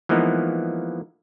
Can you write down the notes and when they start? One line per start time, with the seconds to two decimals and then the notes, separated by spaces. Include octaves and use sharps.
0.09 E3 F3 G#3 A#3 B3 D#4